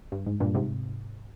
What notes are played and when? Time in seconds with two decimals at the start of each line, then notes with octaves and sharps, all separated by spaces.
0.12 G2
0.26 G#2
0.40 G2 A#2
0.55 G#2 C3